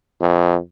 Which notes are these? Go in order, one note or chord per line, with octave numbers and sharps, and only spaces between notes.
F2